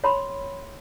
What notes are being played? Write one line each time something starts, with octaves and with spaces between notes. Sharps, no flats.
C#5 B5 C6